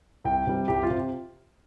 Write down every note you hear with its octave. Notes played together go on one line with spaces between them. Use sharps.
C2 G5
C3 G3
C2 G4
F4
C3